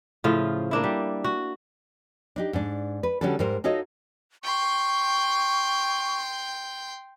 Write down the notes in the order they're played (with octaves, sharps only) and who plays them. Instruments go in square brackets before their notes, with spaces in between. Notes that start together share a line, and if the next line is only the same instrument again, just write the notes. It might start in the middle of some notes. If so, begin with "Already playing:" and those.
[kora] A2 C#3 F3 F4
A#3 D4 E4
G3
F#4
[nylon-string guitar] D4 D#4 G4
G#2 D4
B4
D3 G3 C#4 D4 F#4 A4
G#2 G3 A#4 C5
D#4 F4 F#4 A4 C#5 D#5
[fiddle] G5 C6 [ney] C#6